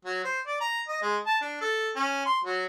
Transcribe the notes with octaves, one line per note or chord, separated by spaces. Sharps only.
F#3
C5
D5
A#5
D#5
G#3
A5
D4
A4
C#4
C6
F#3